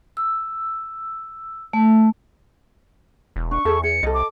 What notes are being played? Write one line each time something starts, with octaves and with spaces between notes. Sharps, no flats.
E6
A3
E1
D4 C#6
E2 G#4 A4
G#4 C#7
C2 A4 D#5
D6